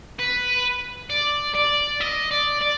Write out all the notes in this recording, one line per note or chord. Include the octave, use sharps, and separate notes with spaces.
B4
D5
D5
D#5
D5
D5